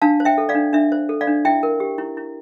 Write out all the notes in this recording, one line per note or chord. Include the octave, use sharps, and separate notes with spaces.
D4 F5 A5
C5
E5 G5
A4
D5 F5
D4
D4 E5
C5
A4
D5 F5
D4
E4 E5 G5
A#4
G4
E4
E4